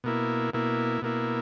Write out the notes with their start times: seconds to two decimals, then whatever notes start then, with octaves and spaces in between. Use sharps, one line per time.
0.04 B2 A#3 E4
0.53 B2 A#3 E4
1.02 B2 A#3 E4